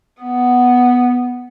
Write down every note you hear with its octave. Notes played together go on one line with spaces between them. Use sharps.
B3